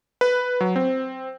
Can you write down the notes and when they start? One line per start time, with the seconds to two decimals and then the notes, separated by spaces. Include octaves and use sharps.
0.21 B4
0.61 F#3
0.76 C4